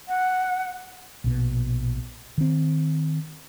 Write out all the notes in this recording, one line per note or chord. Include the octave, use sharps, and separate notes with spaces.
F#5
A#1 B2
D#3 C4